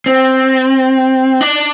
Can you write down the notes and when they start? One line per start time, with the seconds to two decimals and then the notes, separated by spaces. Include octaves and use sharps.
0.06 C4
1.41 D4